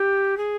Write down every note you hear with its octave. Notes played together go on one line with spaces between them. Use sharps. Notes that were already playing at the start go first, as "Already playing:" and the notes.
Already playing: G4
G#4